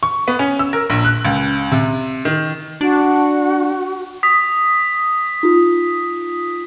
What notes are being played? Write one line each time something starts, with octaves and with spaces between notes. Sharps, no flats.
C#6
B3
C#4
E6
A#4
A#1
F#6
C#2
C3
D#3
D4 F#4
D#6 B6
D#4 F4